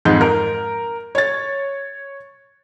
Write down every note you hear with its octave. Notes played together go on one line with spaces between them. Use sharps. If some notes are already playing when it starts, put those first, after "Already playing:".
F2 G#2 G#3 G6
A#4
C#5 A6